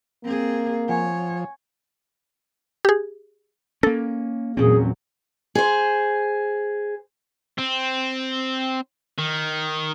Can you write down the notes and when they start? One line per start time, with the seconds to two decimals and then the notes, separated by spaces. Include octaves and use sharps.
0.24 A#3 C4 G#4
0.89 F3 C#5 F#5 G#5
2.85 G4 G#4
3.83 A#3 C#4 A4
4.57 E2 A#2 F#3 C4 C#4 G#4
5.55 G#4 C5
7.59 C4
9.18 D#3